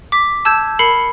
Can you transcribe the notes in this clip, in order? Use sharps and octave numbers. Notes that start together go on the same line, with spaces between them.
D6 B6
A5 E6 G6 G#6 E7
A#4 B5 C7 C#7